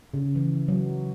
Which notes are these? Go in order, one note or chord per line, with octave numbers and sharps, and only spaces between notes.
C#3
E3
F#3